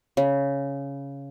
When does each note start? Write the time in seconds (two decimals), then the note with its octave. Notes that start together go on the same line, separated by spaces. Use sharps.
0.17 C#3